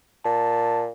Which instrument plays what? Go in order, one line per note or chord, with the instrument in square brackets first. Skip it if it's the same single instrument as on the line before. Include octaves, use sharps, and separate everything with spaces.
[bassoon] A#2 [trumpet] A5